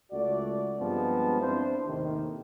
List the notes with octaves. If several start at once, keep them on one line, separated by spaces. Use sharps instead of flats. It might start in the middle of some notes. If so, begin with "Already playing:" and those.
C#2 A3 F#4 D5
G2 F3 G#3 B3 C4 A5
C4 D4 E4 C5
D#2 A2 C3 D#3